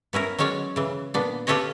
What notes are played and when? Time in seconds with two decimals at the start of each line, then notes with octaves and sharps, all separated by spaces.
0.13 B3 C#4 E4 A#4
0.38 F#3 G#3 C#4 C#5 D5
0.76 C#3 E3
1.14 A#2 B3 D4
1.47 F4 G4 A4 B4 C#5 D#5